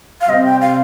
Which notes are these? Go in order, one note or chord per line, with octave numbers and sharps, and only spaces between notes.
F5
C3 G3 C4 D#5
G5
F5